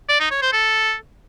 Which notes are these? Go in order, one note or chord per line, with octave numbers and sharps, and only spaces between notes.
D5
D#4
C#5
C5
A4